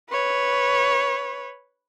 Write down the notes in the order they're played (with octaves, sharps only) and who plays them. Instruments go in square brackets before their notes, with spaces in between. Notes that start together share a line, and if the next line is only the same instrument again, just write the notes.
[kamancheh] B4 C#5